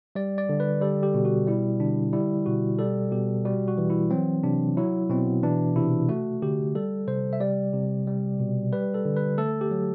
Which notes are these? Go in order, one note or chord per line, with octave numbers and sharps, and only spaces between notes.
G3 D5
D5
D3
B4
G3 A4
G4
B2
F#4
G3 E4
D3 D4
G3 E4
B2 F#4
G3 A4
B2 G4
G3 F#4
F#4
E3
E4
F#3 C4
C3 D4
F#3 E4
B2 C4
E3 D4
C3 E4
A3 F#4
D3 G4
G3 A4
C3 C5
E5
G3 D5
C3
G3
B2
G3 B4
A4
D3
B4
A3 A4
G4
F#3